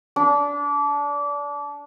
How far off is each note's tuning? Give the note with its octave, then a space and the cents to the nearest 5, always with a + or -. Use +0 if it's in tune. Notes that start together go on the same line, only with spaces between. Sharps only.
D4 -25